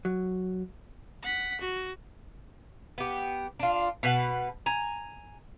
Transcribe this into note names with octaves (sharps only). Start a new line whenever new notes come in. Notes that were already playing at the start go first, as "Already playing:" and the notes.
F#3
F#5 B6
F#4
B3 G4
D4 F4
B2 B4 F#5
G#5 A#5